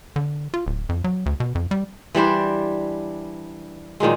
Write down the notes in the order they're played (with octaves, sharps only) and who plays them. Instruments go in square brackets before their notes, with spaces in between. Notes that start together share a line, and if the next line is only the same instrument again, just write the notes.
[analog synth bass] D3
F4
D1
F2
F#3
D2
B2
F2
G3
[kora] E3 G3 D4 C5
A#2 D#3 F#3 G#3